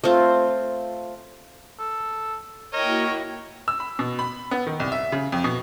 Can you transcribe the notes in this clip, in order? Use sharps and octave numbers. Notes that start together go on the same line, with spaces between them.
A3 C4 F4
A4
A#3 E4 F#4 A#4 C#5 D#5 G5
E6
B5
B2
B5
B3
D#3
C2
E5
C#3
F2
B2